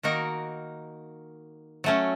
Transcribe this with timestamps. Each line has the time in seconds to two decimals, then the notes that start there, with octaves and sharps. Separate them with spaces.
0.03 D#3 A#3 D#4 F#4 A#4
1.84 F#3 A3 C#4